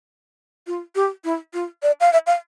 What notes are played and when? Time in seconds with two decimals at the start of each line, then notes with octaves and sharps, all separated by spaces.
0.67 F4
0.95 G4
1.24 E4
1.54 F4
1.83 D5
2.00 F5
2.13 E5
2.27 F5